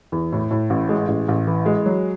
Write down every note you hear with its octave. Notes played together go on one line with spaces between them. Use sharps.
E2
A2
A2
A1
G#3
A1
A1
E3
G#3
F#3